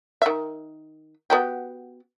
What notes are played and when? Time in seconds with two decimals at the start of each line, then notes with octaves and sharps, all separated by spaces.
0.22 D#3 E5
1.30 B3 F#4 G4